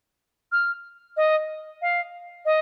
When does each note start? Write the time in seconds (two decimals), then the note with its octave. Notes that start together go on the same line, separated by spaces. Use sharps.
0.52 F6
1.17 D#5
1.82 F5
2.45 D#5